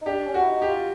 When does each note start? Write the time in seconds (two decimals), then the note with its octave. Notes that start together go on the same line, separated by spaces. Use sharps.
0.02 D#4
0.06 D4 G4
0.27 C#4
0.34 F#4
0.42 E4
0.48 D#4
0.62 G4
0.68 F4